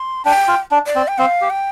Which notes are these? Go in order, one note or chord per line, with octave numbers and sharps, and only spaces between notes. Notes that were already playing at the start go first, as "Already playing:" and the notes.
Already playing: C6
D4 G5
F4
D4
D5
C4
G5
C4 F5
G4
G5